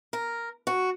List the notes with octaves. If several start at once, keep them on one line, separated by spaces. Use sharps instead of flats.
A#4
F#4